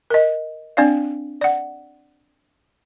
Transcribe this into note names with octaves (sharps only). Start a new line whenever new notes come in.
A#4 D#5
C4 D4 D5 F5
D5 F#5